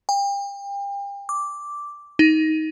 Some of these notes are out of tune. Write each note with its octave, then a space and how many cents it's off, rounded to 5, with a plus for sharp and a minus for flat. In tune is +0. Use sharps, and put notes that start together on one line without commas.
G5 +35
D6 -5
D#4 +15